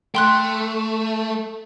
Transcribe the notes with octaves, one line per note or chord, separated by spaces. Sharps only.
A3 G5 C6 F#6